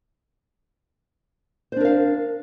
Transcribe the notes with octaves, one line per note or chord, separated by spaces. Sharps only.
D4 A#4 C5 F5